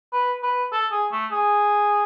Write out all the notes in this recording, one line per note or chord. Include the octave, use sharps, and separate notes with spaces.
B4
B4
A4
G#4
A3
G#4